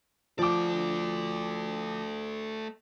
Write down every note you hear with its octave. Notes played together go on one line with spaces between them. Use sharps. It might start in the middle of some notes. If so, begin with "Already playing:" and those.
F3 A3 D5 D6